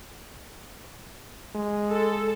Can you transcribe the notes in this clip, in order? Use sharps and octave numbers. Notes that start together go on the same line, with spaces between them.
G#3
A4